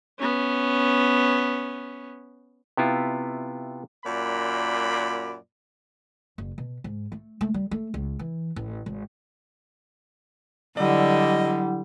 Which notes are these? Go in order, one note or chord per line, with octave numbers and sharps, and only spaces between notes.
B3 C#4
C3 B3 E4 F4
F#2 A#2 D5 B5
F#1
B2
G#2
A3
A3
G3
A3
C#2
E3
A1
G#1
D3 F#3 G3 E4 D#5 F#5